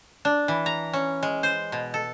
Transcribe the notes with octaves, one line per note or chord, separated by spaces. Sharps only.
D4
E3
A#5
C#4
G#3
C5
B2
A4